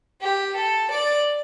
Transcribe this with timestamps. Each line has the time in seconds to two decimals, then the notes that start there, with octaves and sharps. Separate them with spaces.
0.21 G4
0.55 A4
0.90 D5